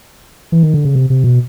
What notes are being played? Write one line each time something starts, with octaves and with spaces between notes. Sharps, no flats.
E3
D#3
D3
C#3
C3
C3
B2